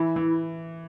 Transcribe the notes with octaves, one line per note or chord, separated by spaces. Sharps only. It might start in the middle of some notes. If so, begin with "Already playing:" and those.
Already playing: E3 E4
E3